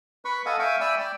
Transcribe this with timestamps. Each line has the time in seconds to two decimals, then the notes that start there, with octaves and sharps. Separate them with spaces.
0.25 B4 B5 C#6
0.46 A4 D#5 F5 F#5 G#5
0.59 E5 F5 G5 G#5 C#6
0.81 D5 E5 G5 G#5 B5 E6
0.99 D5 G5